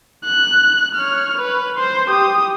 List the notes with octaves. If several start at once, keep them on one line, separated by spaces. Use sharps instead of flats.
F#6
C#5 F6
B4
C5 C6
G4 D#6